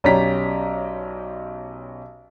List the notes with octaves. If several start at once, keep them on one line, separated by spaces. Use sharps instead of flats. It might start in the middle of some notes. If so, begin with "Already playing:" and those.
B1 C#4 G4 D5 A#5 B6